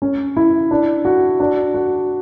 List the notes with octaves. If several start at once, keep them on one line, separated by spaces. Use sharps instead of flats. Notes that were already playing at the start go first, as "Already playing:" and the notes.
C#4
E4
D4
F#4
D4
F#4